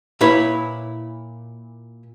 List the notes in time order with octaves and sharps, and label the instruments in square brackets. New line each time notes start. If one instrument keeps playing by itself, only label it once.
[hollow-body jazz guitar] A#2 E4 B4 C#5